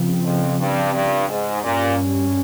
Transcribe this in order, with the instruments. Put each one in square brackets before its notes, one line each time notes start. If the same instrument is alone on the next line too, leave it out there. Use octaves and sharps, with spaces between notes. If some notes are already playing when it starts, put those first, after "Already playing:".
Already playing: [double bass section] C#3 F3 C4
[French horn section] F2
G2
G2
G#2
[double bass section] G2 G3 C#4 [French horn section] A#2